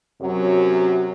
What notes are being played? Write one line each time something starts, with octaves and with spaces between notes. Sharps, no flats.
F#2 C3 F#3